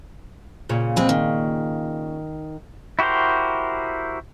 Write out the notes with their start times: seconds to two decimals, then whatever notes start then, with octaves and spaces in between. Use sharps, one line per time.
0.69 A#2 C#3
0.96 G#3 C4 B4
1.09 D#3
2.99 E4 F#4 G4 A#4 C5